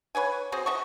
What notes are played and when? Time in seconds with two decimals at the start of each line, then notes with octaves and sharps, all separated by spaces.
0.15 B4 C#5 F#5 G#5
0.52 C4 F#4 G#4 C5
0.66 D#5 F#5 A5 C#6